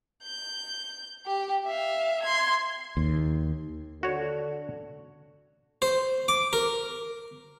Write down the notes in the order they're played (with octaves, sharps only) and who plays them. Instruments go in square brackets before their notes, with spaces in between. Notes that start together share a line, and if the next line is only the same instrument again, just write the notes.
[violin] G6
G4
E5 F5
C6 G#6
[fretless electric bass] D#2
[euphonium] D3 [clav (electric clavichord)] F#4 C#5
[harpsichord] C5
D6
A#4